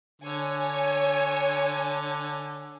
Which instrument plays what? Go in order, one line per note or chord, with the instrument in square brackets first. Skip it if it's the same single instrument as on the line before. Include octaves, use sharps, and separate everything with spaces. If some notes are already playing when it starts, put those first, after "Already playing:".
[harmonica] D3 [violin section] C#5 G#5